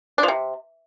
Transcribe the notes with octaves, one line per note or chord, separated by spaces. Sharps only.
D4
F3
C3